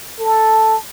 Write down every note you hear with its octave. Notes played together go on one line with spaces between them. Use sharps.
A4